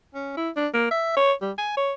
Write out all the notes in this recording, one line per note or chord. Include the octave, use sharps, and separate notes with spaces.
C#4
E4
D4
A#3
E5
C#5
G3
G#5
C#5